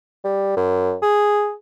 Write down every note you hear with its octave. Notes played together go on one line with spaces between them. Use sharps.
G3
F#2
G#4